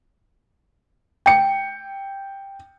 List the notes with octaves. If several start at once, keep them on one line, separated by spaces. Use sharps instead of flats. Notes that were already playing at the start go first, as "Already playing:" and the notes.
G5 C#7